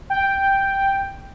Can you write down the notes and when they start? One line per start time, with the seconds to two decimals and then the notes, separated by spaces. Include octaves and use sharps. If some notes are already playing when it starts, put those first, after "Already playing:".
0.10 G5